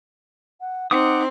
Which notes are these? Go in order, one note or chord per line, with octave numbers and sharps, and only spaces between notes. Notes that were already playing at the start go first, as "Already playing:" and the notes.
F#5
C4 D#4 F#5 D6 D#6